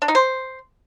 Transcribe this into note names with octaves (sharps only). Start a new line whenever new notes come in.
D4
D#4
C5